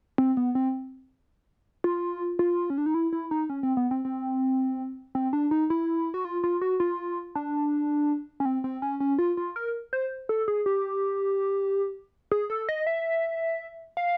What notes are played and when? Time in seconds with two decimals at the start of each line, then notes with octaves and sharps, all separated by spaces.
0.18 C4
0.37 B3
0.55 C4
1.84 F4
2.39 F4
2.70 C#4
2.78 D4
2.86 D#4
2.94 E4
3.13 E4
3.31 D#4
3.50 C#4
3.63 C4
3.77 B3
3.91 C4
4.05 C4
5.15 C4
5.33 D4
5.51 D#4
5.70 E4
6.14 F#4
6.25 F4
6.44 F4
6.61 F#4
6.80 F4
7.35 D4
8.40 C#4
8.45 C4
8.64 C4
8.82 C#4
9.00 C#4
9.18 F4
9.37 F4
9.56 A#4
9.93 C5
10.29 A4
10.48 G#4
10.66 G4
12.32 G#4
12.50 A4
12.69 D#5
12.87 E5
13.97 F5